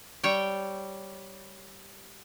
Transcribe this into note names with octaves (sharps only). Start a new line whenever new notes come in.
G3 C#5 G5